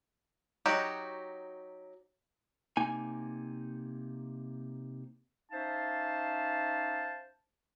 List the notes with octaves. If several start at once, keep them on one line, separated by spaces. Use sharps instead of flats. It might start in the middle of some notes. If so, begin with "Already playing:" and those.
F#3 D#4 F#4 G4
C3 A#3 D#4 G#5
C#4 D#4 C5 E5 F5 A5